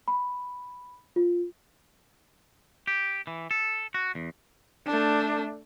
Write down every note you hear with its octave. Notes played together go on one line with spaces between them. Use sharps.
B5
F4
G4
E3
A4
F#4
E2
A3 D4